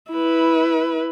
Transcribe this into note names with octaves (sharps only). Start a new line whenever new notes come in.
E4 B4